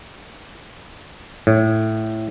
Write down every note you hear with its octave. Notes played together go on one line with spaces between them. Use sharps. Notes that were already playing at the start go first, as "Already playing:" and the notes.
A2